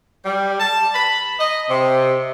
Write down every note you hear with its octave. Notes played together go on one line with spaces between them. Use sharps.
G3
A5
B5
D#5
C3